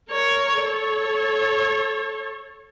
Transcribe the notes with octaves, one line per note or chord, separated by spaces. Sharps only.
A#4 C#5
A4 C#5